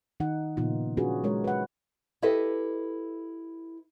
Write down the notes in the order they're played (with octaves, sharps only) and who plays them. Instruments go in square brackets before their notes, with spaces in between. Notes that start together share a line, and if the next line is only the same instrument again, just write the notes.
[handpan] D#3 D#4 F#5
A#2 C#3 F3 B3 D#4 F4
C#4 D4 F4 F#4 G#4 B4
F#3 G#3 A#4 C#5
B4 F#5
[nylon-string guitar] E4 G4 A4 B4 D#5 E5